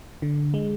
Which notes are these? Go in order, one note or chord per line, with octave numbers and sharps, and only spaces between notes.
D3
G#3